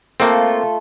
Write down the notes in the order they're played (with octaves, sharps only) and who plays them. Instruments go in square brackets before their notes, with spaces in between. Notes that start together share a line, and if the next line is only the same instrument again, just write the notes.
[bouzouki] A3 F4 A4 [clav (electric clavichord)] A#3 C4